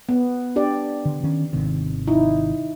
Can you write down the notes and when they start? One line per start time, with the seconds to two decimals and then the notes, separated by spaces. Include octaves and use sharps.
0.09 B3
0.56 D4 G4 D5
1.05 D3
1.24 D#3 C#4
1.53 G#1 C3 D#3
2.07 D#4 E4